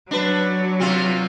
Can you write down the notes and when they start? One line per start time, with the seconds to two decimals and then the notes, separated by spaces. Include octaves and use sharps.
0.11 F#3 D4 B4
0.80 C3 C4 F4